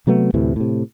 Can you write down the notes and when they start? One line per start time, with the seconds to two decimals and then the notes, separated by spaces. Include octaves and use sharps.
0.07 C3 F#3 A3 B3
0.34 D2 A2 C3 E3
0.56 A2 C3